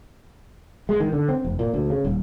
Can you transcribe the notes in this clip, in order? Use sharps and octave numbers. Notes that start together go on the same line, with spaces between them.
G#3
D#3
D3
C4
F1
A#2
D2
C#3
D#1